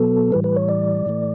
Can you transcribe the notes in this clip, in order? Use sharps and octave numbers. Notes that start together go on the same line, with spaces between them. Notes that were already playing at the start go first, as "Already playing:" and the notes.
Already playing: B2 F#3 B3 A4
A2 E3 G3 B4
B4
C#5
D5
A2 E3 A3